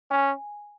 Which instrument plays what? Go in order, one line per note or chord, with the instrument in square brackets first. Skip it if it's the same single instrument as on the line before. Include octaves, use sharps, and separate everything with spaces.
[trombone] C#4 [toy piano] G#5